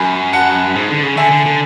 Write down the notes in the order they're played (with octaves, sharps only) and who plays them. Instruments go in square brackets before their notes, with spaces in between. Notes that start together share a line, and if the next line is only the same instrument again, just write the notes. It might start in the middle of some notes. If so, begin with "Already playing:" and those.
Already playing: [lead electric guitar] F#2 [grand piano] G#5 B5
[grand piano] F#5 A5
[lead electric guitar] G#2
D3
C#3
[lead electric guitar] D3 [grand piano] E5 G#5
[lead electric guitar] D3
D3